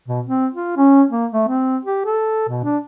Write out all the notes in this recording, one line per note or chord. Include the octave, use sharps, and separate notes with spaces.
B2
C4
F4
C#4
A#3
A3
C4
G4
A4
B2
D4